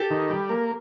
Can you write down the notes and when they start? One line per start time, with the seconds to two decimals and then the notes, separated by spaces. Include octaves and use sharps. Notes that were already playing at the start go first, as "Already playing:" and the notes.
Already playing: G4 A4
0.11 D#3
0.30 G3
0.49 A#3